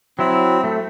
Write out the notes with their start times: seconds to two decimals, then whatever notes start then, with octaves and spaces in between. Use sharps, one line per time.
0.19 F#3 C4 E4
0.64 A3